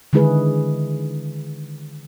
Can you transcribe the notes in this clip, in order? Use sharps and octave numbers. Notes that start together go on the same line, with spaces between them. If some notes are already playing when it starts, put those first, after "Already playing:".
D3 D#3 G#3 E4 G#4 B4